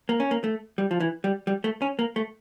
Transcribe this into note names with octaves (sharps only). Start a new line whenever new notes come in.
A#3
C#4
A#3
A3
G3
F3
E3
G3
G3
A3
C#4
A#3
A3